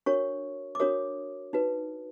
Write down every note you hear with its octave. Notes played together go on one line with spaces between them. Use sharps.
D4 F#4 A#4 C#5 C#6
D6
D4 F#4 A#4 C#5 D#6
D#4 F#4 B4